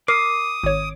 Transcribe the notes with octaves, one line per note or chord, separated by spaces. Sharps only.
A#4 D6 D#6 C7
G#1 C#5